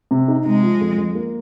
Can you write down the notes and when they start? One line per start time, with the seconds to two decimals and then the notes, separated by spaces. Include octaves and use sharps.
0.11 C3
0.28 D#4
0.45 C3 G#3
0.63 F3
0.81 F2
0.98 F2
1.15 A#3